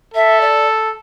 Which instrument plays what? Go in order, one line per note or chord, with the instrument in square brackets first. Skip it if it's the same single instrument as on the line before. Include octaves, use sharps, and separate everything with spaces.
[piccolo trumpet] A4 [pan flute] E5
[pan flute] D5